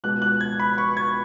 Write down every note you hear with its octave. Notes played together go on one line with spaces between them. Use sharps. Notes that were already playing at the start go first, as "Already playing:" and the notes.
C#2 B2 G#3 F#6
F#6
G#6
B5
C#6
G#6